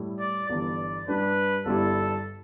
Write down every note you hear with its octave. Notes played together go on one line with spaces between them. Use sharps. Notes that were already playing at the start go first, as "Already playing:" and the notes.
Already playing: A2 G3 E4
D5
G1 G2 E3 D5
G2 G3 D4 B4
G1 G2 G3 E4 A4